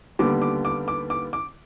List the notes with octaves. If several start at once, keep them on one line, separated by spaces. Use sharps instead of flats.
D#2 D3 G3 B3 D6
D6
D6
D6
D6
D6